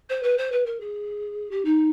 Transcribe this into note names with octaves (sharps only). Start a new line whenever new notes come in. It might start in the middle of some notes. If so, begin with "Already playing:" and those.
C5
B4
C5
B4
A#4
G#4
G4
D#4